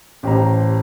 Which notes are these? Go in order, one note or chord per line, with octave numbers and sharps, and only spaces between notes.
A1 G4 C5 A#5